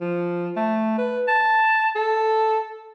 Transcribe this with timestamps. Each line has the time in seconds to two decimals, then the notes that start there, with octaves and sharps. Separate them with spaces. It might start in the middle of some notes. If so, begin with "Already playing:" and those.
0.01 F3
0.56 A3
0.98 B4
1.28 A5
1.95 A4